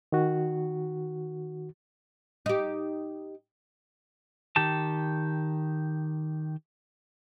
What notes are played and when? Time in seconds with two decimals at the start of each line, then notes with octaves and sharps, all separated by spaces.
0.12 D#3 F#4
2.46 D#4 G4
4.56 D#3 G4 A5